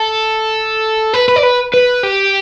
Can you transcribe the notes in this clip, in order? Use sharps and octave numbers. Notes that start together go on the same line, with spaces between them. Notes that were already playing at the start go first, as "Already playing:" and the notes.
Already playing: A4
B4
B4
D5
B4
B4
G4